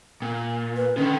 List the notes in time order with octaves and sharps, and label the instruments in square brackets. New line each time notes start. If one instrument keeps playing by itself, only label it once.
[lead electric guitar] A#2
[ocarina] B4
[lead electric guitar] D3 D#3 [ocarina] C#4